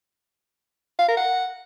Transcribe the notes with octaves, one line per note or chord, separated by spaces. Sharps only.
F5
A#4
F#5